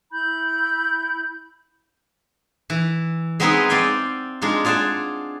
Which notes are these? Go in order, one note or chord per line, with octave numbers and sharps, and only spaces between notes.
E4 B5 G6
E3
G#3 B3 C4 D#4 G#4 B4
C4 D5 F5 G5 G#5
G#3 D4 D#4 F4
F4 G#4 D5 F#5 A5